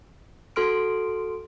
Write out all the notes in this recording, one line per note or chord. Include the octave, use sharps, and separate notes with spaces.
F#4 A4 C6 F6 D7